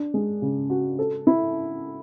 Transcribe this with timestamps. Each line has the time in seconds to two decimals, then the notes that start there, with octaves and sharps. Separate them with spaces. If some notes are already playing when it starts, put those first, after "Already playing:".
Already playing: D4
0.14 G#3
0.42 C#3
0.70 F#4
0.99 A4
1.27 E4